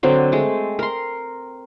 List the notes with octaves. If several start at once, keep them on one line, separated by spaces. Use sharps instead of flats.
D3 F#3 C4
G#3 A3
A#4 C6